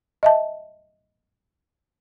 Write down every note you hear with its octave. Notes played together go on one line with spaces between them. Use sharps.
D#5 E5 A5